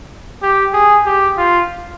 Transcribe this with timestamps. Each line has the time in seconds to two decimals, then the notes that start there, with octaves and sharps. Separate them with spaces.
0.43 G4
0.73 G#4
1.06 G4
1.37 F4